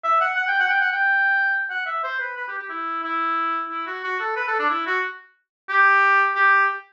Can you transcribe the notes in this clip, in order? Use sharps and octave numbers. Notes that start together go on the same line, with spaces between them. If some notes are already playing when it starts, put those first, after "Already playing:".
E5
F#5
F#5
G5
F#5
G5
F#5
G5
F#5
E5
C5
B4
B4
G4
G4
E4
E4
E4
F#4
F#4
A4
B4
A4
D4
E4
F#4
G4
G4